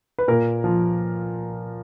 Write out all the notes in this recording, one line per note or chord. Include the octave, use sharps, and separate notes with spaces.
B4
A#2 A#4
F3